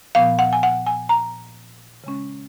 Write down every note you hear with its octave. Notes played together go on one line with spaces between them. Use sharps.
A#2 F3 B3 F5
F#5
G#5
F#5
G#5
A#5
C#3 G#3 C#4